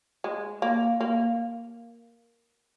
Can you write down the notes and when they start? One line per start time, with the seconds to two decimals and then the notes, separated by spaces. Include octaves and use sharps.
0.24 G#3
0.62 A#3
1.00 A#3